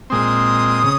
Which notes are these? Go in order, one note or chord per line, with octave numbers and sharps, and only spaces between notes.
A#2 G#3 C4 D#6
C#3